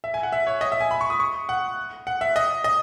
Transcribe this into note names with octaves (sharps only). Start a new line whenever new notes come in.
E5
G#5
F#5
E5
C#5
D#5
E5
G#5
B5
C#6
D#6
C#6
F#5
F#5
E5
D#5
D#5